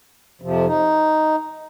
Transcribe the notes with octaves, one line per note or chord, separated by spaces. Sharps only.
F2 C3 F3
D#4